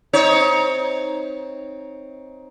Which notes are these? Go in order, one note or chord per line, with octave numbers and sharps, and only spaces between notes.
C4 D#4 C#5